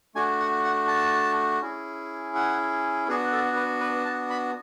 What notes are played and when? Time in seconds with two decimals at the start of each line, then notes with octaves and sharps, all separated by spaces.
0.15 A3 D4 F#4 G#5
0.40 F#5
0.64 F#5
0.88 A5
1.62 C#4 E4 G#4
2.35 F#5
3.08 B3 D4 F#4 G#4
3.32 A4
3.56 B4
3.81 B4
4.05 A5
4.30 B5